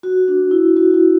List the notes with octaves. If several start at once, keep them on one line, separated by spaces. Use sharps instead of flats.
F#4
D4
E4
F#4
E4